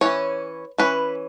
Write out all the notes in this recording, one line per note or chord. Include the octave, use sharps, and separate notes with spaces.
E3 C#4 C#5
E3 C#4 B4